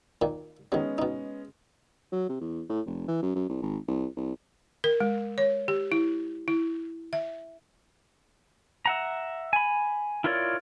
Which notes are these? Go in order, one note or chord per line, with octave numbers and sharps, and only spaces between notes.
A#2 D#3 A#3
D#3 F#3 G#3 B3 C#4
B2 D#4
F#3
C3
E2
A2
F1
E3
F#2
F#2
C2
G#1
C2
C2
A#4
G#3
C#5
G4
E4
E4
E5
E5 F#5 A#5
G#5 B5
E4 F4 A#4 C#5 D5